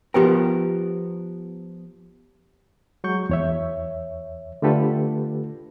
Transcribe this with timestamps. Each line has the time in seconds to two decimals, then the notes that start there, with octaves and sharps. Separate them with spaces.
0.14 F3 B3 G4 A#4 B4 G5
3.04 F#3 G#3 C#6 G6
3.30 E2 C#5 E5
4.62 D3 A3 F4 G4 A4 B4